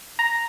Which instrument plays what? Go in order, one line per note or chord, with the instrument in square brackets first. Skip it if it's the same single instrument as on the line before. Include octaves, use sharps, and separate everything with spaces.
[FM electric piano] A#5